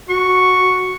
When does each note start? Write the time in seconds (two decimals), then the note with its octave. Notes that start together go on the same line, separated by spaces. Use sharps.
0.09 F#4 C#6